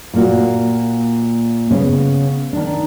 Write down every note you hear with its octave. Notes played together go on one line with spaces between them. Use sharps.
A#2 A#3 F#4
C#3 B3 C#4
D#3 D4